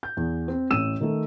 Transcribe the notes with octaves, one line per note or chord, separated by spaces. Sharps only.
G6
E2
C4
A1 E6 D#7 E7
D#3 A3